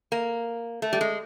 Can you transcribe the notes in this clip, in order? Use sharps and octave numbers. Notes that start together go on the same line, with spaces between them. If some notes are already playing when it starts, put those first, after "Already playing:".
A#3
A3
G3
G#3